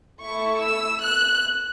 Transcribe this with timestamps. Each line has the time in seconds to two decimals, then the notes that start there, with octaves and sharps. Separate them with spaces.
0.21 A3 E4 A4 C#6
0.62 E6
1.03 F#6